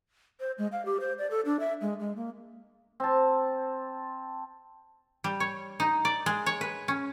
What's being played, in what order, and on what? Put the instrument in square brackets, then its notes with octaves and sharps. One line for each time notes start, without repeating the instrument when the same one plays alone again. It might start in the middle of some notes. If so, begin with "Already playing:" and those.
[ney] C5
G#3
F5
G4
C5
D5
A4
D4
E5
G#3
G#3
A#3
[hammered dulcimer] C4 A5
[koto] G3
C#5
D#4
D5
G#3
C#5
B4
C#4